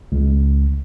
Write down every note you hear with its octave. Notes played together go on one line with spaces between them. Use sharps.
C#2